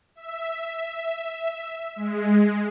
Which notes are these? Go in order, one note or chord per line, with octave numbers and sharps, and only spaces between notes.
E5
G#3